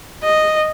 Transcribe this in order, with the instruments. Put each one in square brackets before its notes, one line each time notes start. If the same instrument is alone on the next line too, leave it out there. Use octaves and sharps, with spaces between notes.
[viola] D#5